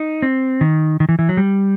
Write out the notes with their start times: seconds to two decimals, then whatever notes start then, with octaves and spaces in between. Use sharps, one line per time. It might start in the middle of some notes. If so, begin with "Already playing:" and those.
Already playing: D#4
0.22 C4
0.61 D#3
1.00 D#3
1.09 E3
1.19 E3
1.29 F#3
1.37 G3